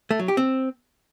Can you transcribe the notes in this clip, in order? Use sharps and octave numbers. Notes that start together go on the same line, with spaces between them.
A3
F#3
G4
C4